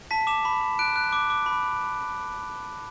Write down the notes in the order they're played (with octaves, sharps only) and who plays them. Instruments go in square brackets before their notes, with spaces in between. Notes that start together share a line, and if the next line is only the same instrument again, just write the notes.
[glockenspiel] A5 B6
D6 E7
B5
B5
F#6 D7
F#6
D6
D6
B5